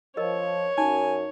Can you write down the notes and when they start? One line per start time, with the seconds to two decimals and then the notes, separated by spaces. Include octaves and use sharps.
0.17 F3 A#4 C#5 D#5
0.78 F#2 D#4 G#5